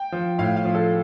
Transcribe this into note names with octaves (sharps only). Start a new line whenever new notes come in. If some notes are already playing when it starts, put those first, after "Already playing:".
Already playing: G5
F3
A2 F5
F5
F3
A4